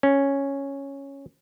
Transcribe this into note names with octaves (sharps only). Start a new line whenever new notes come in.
C#4